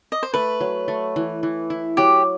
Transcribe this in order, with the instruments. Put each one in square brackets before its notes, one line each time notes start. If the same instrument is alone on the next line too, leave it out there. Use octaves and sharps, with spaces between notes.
[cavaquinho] D#5
C5
[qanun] A3 [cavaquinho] B4
[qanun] F#3
A3
E3
E3
E4
[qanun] F#3 [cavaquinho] G4